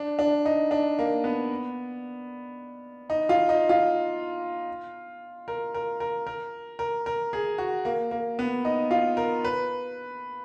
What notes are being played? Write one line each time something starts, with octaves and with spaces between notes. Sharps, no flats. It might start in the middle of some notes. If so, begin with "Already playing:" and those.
Already playing: D4
D4
D#4
D4
A#3
B3
D#4
F4
D#4
F4
A#4
A#4
A#4
A#4
A#4
A#4
G#4
F#4
A#3
A#3
B3
D#4
F4
A#4
B4